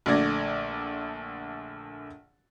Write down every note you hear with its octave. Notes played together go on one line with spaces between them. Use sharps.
A#1 D3 A3 D5 G#6 A#6